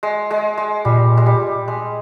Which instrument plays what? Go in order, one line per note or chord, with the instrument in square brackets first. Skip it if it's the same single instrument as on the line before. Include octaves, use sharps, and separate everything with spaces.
[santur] G#3
G#3
G#3
[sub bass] A#2 [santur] G3
[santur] G#3
G3
G#3